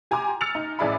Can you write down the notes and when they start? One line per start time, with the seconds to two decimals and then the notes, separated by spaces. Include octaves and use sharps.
0.11 G4 G#5 A#5 C6 D6
0.41 E6 F6 A6 C#7 F7
0.55 D#4
0.79 A1 E4 G#4 D5 E5 B5